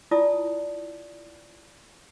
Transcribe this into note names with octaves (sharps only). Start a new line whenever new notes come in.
E4 F4 D5 A5 D#6